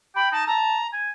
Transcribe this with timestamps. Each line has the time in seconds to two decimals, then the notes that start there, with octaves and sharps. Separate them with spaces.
0.16 G5 B5
0.32 D#4 A5
0.47 A5 A#5
0.93 G#5